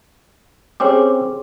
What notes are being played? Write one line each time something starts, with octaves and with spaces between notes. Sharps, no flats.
C4 C#4 G4 G#4 C#5 D6